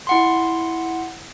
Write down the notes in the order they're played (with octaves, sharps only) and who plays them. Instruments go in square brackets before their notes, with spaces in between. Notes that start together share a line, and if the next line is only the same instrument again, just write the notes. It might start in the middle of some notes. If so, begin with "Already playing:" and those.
[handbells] E4 F#5 C6